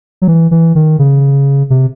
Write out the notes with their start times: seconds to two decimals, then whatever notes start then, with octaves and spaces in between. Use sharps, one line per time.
0.22 F#3
0.28 E3
0.51 E3
0.75 D#3
0.99 C#3
1.70 C3